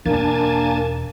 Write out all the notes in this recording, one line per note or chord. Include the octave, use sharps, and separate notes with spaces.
E1 A#3 D4 G#5 A5